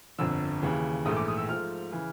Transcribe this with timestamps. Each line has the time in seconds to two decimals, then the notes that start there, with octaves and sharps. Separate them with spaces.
0.19 G1 F2 D3 E6
0.62 D#2 C#3 E3
1.05 A#1 G#2 E3 A3 D#6
1.17 D6
1.28 D#6
1.38 E6
1.49 G#2 F3 A3 F6
1.93 C#3 E3